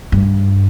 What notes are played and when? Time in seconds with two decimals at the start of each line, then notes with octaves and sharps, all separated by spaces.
0.12 G2